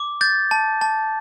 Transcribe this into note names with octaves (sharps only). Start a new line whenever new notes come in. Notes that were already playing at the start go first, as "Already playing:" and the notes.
Already playing: D6
G6 A6
A5
A5